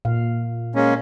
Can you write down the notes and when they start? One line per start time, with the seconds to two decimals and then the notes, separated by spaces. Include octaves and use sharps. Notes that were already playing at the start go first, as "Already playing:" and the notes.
0.05 A#2 F5
0.75 G#3 A#3 C#4